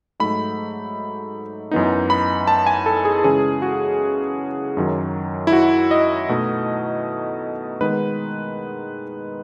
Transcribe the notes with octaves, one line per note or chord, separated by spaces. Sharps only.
G#2 F#3 A3 D#4 B5
F#2 E3 B3 D#4
B5
A5
G#5
A4
G#4
C#3 E3 G#3 C#4 G#4
F#4
F#2 D#3 F#3
E4
F#4
D#5
B2 A3 D#4
D#3 G#3 B3 D#4 B4